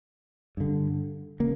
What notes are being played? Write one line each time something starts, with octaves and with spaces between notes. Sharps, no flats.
G2 D3
C#3 A#3